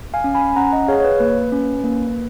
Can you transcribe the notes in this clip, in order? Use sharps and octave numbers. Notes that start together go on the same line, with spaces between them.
F5 G#5
C#4
G#5 B5
C#4 F#5 A#5
D#5 F#5
G#4 C#5 F5
C#5
B4
A#3 B4
C#4
A#3